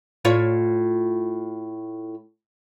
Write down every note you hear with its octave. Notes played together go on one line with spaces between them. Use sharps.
A2 F4 C#5